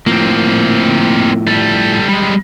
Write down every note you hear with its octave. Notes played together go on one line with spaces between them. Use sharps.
A2 F3 A#3 C4
G3 A4
G3 G#3